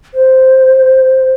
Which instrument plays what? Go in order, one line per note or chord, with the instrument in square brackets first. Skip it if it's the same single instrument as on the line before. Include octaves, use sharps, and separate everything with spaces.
[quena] C5